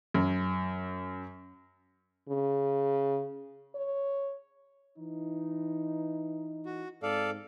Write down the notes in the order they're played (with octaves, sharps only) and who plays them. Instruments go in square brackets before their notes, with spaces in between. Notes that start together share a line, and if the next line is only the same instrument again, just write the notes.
[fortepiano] F#2
[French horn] C#3
C#5
[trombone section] E3 D#4
[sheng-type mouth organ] F#4
[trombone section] G#2 C4 [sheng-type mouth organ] A4 D5 F5